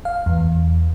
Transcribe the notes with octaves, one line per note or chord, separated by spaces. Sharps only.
F5
E2